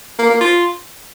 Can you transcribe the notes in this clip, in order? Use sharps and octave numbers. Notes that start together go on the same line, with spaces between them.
A#3
A#3
F4